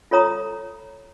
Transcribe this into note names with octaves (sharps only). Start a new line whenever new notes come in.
F4 A4 C#5 A#5 D#6